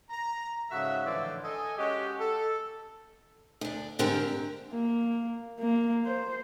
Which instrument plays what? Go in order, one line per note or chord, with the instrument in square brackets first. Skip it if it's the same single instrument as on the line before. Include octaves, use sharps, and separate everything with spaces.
[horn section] A#5
G#2 C#3 F#4 A4 E5
A2 D3 E3 F3 C5 D5
A4 D#5 G#5
G#3 C#4 F#4 G4 C#5 D#5
A4
[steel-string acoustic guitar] D2 D4
G#2 D3 C4 G4 A#4
[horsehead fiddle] A#3
A#3
C5